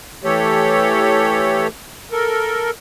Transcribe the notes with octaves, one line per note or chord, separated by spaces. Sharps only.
E3 A3 G4 A4 C#5
A4 A#4